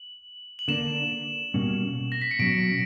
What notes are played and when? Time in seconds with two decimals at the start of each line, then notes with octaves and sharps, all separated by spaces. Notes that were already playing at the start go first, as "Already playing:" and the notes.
Already playing: F#7
0.59 F#7
0.68 D3 A#3 D4 E7
1.54 B2 G3 A#3 C#4
2.12 A#6
2.22 B6
2.31 C#7
2.39 B2 F#3 C#4 D7